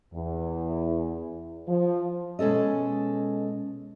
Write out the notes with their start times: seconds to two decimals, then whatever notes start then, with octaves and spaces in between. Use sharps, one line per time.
0.14 E2
1.68 F3
2.39 B2 G#3 C#4 A4 D#5